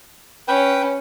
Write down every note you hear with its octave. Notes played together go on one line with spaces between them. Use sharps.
C#4 B4 G5